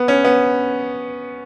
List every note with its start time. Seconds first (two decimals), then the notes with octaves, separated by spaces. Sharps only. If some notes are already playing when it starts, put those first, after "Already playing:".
Already playing: B3
0.08 C#4
0.24 B3